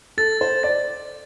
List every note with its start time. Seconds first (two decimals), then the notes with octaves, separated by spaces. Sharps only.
0.18 A4 A6
0.41 C5
0.63 D5 A6